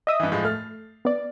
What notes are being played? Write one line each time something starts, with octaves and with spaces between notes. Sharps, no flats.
D#5 E5 D#6
G2 E3
A2 F3 G#3
A3 F6 A6
B3 D5